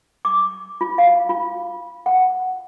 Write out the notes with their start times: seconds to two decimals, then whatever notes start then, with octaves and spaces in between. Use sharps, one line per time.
0.25 D6
0.81 F4
0.98 F5
1.29 F4
2.06 F#5